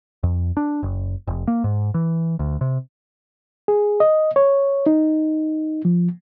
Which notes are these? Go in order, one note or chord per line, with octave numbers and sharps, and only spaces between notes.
F2
D4
F#1
F1
A#3
G#2
E3
D2
C3
G#4
D#5
C#5
D#4
F3